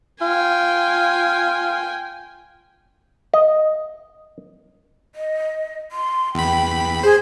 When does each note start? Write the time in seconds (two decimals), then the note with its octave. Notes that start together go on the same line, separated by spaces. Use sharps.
0.21 F4 G5 G#5
3.34 D#5
5.15 D#5
5.92 C6
6.35 E2 G5 B5
7.03 G#4 C5